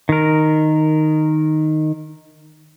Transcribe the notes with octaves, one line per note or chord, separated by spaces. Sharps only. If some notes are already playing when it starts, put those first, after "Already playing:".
D#3 A#4